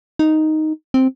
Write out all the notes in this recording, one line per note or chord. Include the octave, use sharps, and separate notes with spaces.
D#4
C4